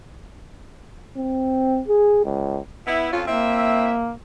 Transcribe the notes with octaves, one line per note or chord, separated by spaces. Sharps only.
C4
G#4
C#2
B3 E4
F2 C#4 F4
A#3 C4 E4 E5